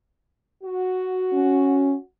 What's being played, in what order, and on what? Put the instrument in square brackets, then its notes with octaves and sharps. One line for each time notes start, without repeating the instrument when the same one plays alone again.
[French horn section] F#4
[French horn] C#4